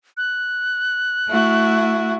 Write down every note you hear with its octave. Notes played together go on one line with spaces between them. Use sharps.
F#6
A3 E4 F#4